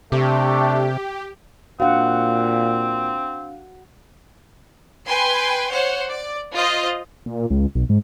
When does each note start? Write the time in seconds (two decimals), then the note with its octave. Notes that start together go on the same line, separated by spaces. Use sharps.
0.12 C3 A3 D4 G4
1.80 A#2 C4 D4 F#4 F5 F#5
5.06 B4 G5 G#5 C6
5.71 C5 C#5 F#5
6.06 D5
6.53 F4 C5 D#5
7.26 A#2
7.50 C#2
7.75 B1
7.89 G#2